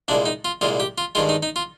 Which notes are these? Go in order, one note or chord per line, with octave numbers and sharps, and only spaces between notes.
C2 A#2 G#3 D4
D#4
F4
C2 A#2 G#3 F4
G4
F4
G2 D#3 G#3 F4
D#4
D#4
F4